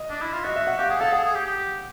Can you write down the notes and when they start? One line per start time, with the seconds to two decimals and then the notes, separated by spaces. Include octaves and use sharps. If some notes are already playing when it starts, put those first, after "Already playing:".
Already playing: D#5
0.10 D4
0.22 E4
0.33 F4
0.44 F#4 D#5
0.56 E5
0.67 F#5
0.78 G4 F5
0.89 G#4 F#5
1.01 A4 F5
1.12 G#4 F#5
1.24 G#4
1.35 G4
1.46 G4